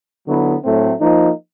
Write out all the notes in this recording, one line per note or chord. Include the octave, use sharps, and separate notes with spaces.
D3 F#3 B3 E4
A2 F#3 A3 C4
F3 A#3 D#4